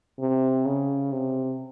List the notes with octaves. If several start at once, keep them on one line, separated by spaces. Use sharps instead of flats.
C3
C#3
C3